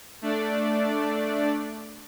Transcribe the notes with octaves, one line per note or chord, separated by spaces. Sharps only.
A3 D4 D5